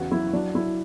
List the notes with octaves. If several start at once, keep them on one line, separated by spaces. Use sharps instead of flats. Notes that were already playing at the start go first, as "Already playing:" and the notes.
Already playing: E2 C#3 F#4
F#3 E4
F#3 D4
F#3 E4